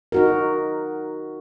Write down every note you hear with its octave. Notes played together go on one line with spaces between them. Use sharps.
D#4 F#4 A#4